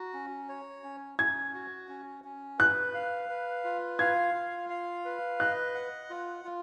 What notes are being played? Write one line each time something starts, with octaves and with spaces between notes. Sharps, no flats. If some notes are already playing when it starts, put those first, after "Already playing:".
Already playing: F#4 A#5
C#4
C#5
C#4
C#4 G#6
F#4
C#4
C#4
B4 F#6
F5
B4
F4
F5 G#6
F4
F5
B4
D#5 F#6
F#5
F4
F4